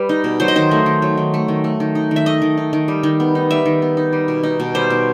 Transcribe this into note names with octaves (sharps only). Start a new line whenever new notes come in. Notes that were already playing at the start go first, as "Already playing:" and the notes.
Already playing: G3 B4
D#4
B2
F#3 C5
D#5
D#3 C5
A3
D#3
F#3
D#3
A3
D#3
A3
D#3
D#4
D#3
E5
A3 D#5
D#3
D#4
D#3
G3
D#3
B3
D#4
G3 E5
D#3
B3
D#4
G3
B2
D#4
B2
G3 C5
B2